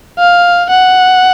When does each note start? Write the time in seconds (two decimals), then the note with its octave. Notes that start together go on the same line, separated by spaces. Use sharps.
0.19 F5
0.70 F#5